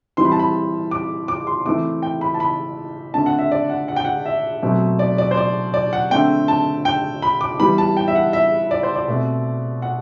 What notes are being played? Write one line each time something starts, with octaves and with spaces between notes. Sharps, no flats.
E3 G3 C4 C6
B5
A5
B5
D6
D6
C6
E3 A3 C4 D6
G5
B5
A5
B5
D3 A3 C4 A5
F#5
E5
D5
F#5
F#5
G5
F#5
E5
B2 F#3 A3 C4
D5
D5
C5
D5
D5
F#5
D3 A3 C4 G5
A5
G5
B5
D6
E3 G3 B3 B5
A5
G5
E5
F#5
E5
D5
C5
D5
B2 A3 C4
F#5